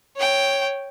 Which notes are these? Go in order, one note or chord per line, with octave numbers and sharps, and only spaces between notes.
C#5 G5